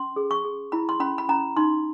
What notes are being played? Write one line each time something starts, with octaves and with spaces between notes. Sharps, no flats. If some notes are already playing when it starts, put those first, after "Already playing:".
Already playing: C#4 C6
G#4
C#6
G#4
E4 B5
C6
C#4 B5
B5
C#4 A#5
D#4 C6